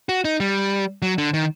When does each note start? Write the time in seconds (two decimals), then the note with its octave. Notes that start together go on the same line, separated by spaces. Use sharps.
0.09 F#4
0.25 D#4
0.40 G3
1.02 F#3
1.18 D3
1.34 D#3